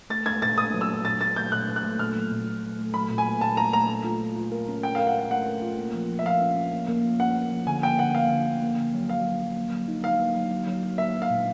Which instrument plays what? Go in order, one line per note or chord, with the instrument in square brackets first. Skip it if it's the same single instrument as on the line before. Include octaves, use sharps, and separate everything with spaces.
[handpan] A3 [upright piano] A6
[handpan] A3 [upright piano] G#6
[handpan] A#2 [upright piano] A6
[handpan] A3 [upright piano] D#6
[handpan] F#3
[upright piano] E6
[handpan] F#3
[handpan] A#2 [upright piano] A6
[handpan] A3 [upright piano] A6
[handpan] A3 [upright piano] G6
[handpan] A#2 [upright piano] F#6
[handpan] A#2
[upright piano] F#6
[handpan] A3
[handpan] A#2 [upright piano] F6
[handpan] F#3
A#2
A#2
A#2
A3
[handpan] F#3 [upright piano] B5
[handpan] A#2
[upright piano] G#5
[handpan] A3
[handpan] A#2 [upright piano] A5
[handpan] A3 [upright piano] A#5
[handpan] A3 [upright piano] A#5
[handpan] A3
F4
F4
F4
A#4
C#4
[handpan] C#4 [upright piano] G5
[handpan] A#4 [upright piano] F5
[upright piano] F#5
[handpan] A#4 [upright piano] F5
[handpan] A3 [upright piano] F#5
[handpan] A#4
F4
A#3
F3
F3
[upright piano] E5
[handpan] F3 [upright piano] F5
[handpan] C#4
C#4
A#3
A#3
F3
[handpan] C#4 [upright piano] F#5
[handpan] A#3
F3
[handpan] D3 [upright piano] G#5
[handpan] A#3 [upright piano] G5
[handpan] D3 [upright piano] F#5
[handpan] A#3 [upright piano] F5
[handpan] D3
D3
A#3
D3
F#3
[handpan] F#3 [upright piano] F5
[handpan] F#3
F#3
A#3
F#3
D#4
[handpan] D#4 [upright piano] F5
[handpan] A#3
F#3
F#3
F#3
F#3
[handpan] A#3 [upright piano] E5
[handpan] F#3
[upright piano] F5
[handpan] A#2